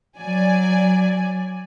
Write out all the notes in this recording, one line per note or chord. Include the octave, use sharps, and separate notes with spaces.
F#3 D5 G#5